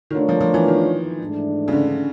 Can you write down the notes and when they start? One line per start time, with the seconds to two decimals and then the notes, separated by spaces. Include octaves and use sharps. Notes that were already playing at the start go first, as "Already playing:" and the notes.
0.11 D#3
0.14 D3 A3 D4 F4 A#4 C#5
0.29 F3
0.41 F3
0.54 E3
0.68 D#3
1.20 G#2 E3 A3 D4
1.68 C#3
1.72 D3